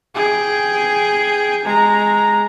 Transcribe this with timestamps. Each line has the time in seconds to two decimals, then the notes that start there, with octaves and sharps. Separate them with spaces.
0.15 G#4 G5
1.66 G#3 A#5